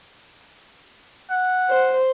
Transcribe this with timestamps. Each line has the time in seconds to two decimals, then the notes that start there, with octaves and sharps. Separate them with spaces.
1.30 F#5
1.70 C5